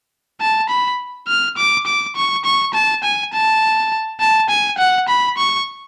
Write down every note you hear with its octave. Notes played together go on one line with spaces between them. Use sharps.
A5
B5
F6
D6
D6
C#6
C#6
A5
G#5
A5
A5
G#5
F#5
B5
C#6